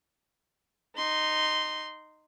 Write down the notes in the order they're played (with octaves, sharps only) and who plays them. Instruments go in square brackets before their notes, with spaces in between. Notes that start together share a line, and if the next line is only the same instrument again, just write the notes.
[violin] D#4 C6